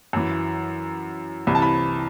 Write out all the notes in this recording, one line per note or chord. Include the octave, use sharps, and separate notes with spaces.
F#2 E3
C2 C3 E3 B5
A5
B5